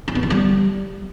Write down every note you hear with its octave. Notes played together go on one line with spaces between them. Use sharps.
C#4
B3
E3
G3